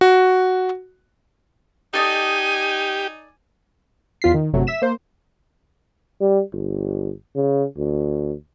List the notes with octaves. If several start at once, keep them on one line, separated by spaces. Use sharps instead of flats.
F#4
D#4 G4 A4 D5 D#5 G#5
E2 F4 B6 C7
D#3
G1 C3 F#3 A3
E5 B6 E7
A#3 C5
G3
G1
C#3
D2